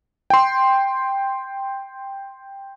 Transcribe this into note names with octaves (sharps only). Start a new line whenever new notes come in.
G5 C6